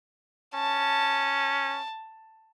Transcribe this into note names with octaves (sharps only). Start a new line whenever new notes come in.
C#4 A5